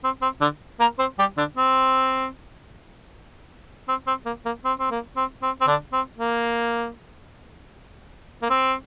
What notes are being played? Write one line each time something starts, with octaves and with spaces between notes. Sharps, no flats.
C4
C4
D3 D4
A#3 A#4
C4 C5
G3 G4
D3 D4
C4
C4
C4
A#3
A#3
C4
C4
A#3
C4
C4
C4
D3 D4
C4
A#3
A#3
C4